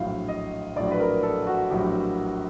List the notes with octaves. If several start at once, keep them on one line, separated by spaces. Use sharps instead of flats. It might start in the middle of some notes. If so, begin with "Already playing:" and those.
Already playing: A#1 A2 F#3 F5
D#5
A#1 A2 F#3 D5
B4
A#4
A4
F#4
A#1 A2 F#3 G4